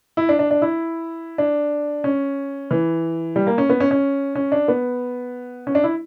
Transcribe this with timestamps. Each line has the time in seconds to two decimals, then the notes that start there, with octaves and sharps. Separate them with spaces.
0.17 E4
0.29 D4
0.39 D4
0.51 D4
0.62 E4
1.38 D4
2.04 C#4
2.71 E3
3.36 G3
3.47 A#3
3.58 C#4
3.70 B3
3.80 C#4
3.91 C#4
4.36 C#4
4.52 D4
4.68 B3
5.67 C#4
5.75 D4
5.84 E4